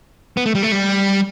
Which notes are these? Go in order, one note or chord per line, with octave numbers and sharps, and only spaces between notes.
B3
A3
G3
A3
G3